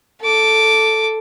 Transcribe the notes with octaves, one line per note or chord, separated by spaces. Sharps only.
A4 D6